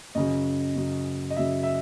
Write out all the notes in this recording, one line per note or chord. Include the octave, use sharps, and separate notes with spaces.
F#2 C#3 F#3 D#5
F#2 C#3 F#3
D#5
F#2 C#3 F#3 E5
E5